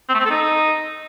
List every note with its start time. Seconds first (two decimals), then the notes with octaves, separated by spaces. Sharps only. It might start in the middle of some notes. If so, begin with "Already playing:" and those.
0.09 C4
0.14 A3
0.20 C4
0.25 A4
0.31 D#4